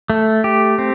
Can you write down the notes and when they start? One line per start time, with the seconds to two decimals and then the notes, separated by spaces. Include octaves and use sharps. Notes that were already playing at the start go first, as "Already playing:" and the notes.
0.10 A3
0.44 G4
0.78 C4